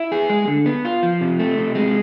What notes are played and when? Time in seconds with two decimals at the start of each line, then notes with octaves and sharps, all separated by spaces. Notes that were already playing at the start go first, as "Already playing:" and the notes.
Already playing: E4
0.12 G#4
0.30 G#3
0.48 D3
0.66 B3
0.85 F4
1.03 F3
1.21 C3
1.40 A3
1.58 C3
1.75 G#3